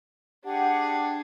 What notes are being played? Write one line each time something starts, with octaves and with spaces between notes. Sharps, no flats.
D4 G4 G#4 F#5